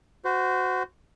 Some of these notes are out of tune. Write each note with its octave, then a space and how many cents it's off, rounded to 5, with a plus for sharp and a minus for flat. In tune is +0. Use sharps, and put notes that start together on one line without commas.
F#4 +0 C5 -30